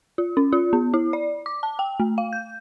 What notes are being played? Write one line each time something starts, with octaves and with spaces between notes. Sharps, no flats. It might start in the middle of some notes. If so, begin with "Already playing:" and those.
F4
C#4
F4
B3
E4
D5
D6
A5
G5
A3
F5
G6